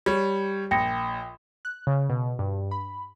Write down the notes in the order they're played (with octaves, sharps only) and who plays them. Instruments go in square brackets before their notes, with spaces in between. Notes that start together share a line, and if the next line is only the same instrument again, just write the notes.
[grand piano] G3 C#5
[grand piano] A#1 [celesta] G5 A#6 C#7
[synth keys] F#6
C#3
B2
G2
B5